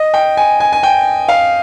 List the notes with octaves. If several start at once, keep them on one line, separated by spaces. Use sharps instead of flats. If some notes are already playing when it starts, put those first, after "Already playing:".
Already playing: D#5
G5
G#5
G#5
G#5
G5
F5